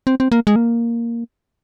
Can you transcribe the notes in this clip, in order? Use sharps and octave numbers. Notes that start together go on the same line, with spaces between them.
C4
C4
A#3
G#3
A#3